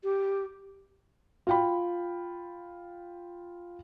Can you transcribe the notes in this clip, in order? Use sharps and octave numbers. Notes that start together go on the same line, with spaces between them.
G4
F4 G5 B5